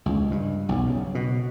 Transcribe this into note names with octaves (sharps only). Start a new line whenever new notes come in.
C#2
G2
B1
C#3
B2